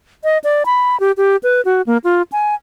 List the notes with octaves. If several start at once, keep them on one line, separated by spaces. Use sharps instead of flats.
D#5
D5
B5
G4
G4
B4
F#4
A#3
F4
G#5